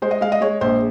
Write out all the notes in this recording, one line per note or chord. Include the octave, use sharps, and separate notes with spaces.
G#3 C5
D#5
G#3 F5
D#5
G#3 C#5
A#1 C5